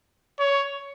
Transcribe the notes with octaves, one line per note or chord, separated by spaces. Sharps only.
C#5